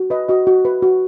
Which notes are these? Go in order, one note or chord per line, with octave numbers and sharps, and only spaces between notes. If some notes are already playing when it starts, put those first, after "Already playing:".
Already playing: F#4
B4 D#5
F#4 D#5
F#4
B4
F#4